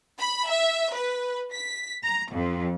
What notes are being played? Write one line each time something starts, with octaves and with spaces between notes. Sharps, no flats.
B5
E5
B4
B6
A#5
F2